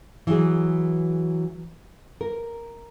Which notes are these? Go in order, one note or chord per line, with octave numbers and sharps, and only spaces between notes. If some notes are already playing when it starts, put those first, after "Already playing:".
E3 F#3 G#4
A#4